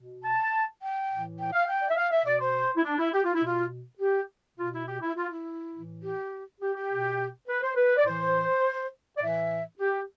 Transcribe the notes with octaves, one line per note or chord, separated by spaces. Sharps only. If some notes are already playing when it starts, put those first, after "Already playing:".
Already playing: B2
A5
G5
A2 E3
G5
F5
G5
D5
E5
F5
E5
B2 D5
C5
E4
D4
E4
G4
F4
E4
B2 F4
G4
B2 F4
E4
G4
E4
F4
E4
A2 E3
G4
G4
G4
B2
B4
C5
B4
D5
A2 E3 C5
D5
A2 E3 E5
G4